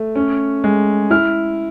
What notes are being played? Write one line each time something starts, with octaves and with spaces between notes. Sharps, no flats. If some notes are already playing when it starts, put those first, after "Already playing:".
Already playing: A3
C#4
G#3
E4 F6